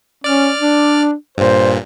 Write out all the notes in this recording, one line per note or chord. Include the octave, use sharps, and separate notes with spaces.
C#4 D5 F6
D4
G2 A#2 C5